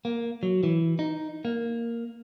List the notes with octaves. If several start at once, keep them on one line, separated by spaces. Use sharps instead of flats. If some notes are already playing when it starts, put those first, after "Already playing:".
A#3
F#3
E3
D#4
A#3